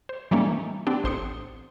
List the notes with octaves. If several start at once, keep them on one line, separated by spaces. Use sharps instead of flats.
C5
E3 G3 A3 A#3 C#4 D#4
B3 C4 D4 G4
A1 C5 C6 D#6 C#7